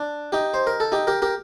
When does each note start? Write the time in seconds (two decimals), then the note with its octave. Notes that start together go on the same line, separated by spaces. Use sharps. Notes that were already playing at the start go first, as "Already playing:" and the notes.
Already playing: D4
0.32 D#4 G4
0.54 C5
0.67 A#4
0.80 A4
0.92 D#4 G4
1.07 G4 A#4
1.22 G4 A#4